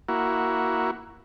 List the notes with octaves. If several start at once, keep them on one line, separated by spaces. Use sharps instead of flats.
A#3 E4 F#4